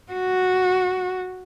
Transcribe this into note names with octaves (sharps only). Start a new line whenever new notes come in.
F#4